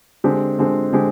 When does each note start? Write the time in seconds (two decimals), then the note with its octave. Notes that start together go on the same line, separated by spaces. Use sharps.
0.24 D3 G#3 C4 G4
0.58 D3 G#3 C4 G4
0.93 D3 G#3 C4 G4